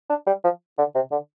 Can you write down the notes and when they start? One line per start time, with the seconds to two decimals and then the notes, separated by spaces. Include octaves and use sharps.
0.09 D4
0.26 G3
0.44 F3
0.78 D3
0.95 C3
1.11 D3